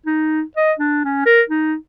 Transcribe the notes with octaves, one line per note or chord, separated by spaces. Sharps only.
D#4
D#5
D4
C#4
A#4
D#4